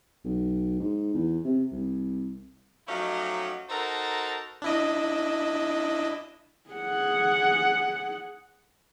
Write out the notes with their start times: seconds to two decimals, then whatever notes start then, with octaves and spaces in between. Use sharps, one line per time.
0.25 B1
0.79 G#2
1.14 E2
1.45 C3
1.72 C2
2.88 F3 F#3 A3 C#4 D#4 G4
3.70 D#4 F#4 A4 A#4 C5 A5
4.62 D4 E4 D#5
6.70 G#4 F#5